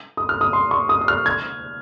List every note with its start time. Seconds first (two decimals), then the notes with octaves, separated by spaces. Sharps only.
0.17 D#6
0.29 F6
0.41 D#6
0.53 C6
0.71 C#6
0.89 D#6
1.01 D#6
1.08 F6
1.26 G#6